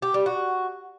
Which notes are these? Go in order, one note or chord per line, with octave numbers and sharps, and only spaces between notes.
G4
G3
F#4